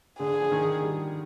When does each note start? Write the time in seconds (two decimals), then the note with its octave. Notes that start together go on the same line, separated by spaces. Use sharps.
0.20 D3 G#4
0.40 F3
0.52 D#3
0.83 G3